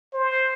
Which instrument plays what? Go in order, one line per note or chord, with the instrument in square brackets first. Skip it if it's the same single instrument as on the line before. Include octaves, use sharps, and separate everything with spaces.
[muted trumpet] C5